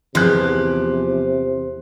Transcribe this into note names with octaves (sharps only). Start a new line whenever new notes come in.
E2 C3 F3 G4 C6 F#6